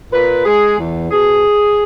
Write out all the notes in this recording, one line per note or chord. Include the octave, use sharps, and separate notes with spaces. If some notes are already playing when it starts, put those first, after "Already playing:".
A#2 B4
G#3 G#4
E2
B2 G#4